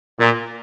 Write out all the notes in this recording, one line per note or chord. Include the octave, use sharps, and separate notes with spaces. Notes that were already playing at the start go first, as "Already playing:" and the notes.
A#2